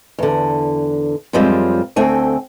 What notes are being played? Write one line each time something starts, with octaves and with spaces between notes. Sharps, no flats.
E2 D3
F#2 F3 G3 G#3 C4 F4
D2 A3 C4 G5 G#5